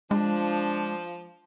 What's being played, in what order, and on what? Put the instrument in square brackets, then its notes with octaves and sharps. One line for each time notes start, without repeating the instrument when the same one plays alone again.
[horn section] F3 [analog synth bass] G#3 [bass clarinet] D4